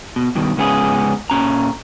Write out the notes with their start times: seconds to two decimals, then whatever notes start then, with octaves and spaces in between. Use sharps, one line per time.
0.16 B2
0.35 G2 B2 D#3
0.57 C#2 G#2 B3 C#4 G#4
1.30 A#2 C#4 A#5